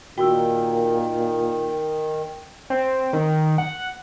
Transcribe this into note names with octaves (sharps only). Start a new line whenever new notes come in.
A#2 D#3 F#4 G5 C6 E6
C4
D#3
F#5